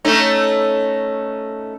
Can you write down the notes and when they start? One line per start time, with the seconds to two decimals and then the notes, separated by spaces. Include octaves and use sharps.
0.05 A3 C#4 D#4